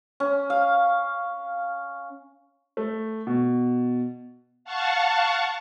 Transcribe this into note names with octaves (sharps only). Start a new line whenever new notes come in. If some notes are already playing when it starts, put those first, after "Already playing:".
C#4
F5
A3
B2
F5 F#5 A5 C#6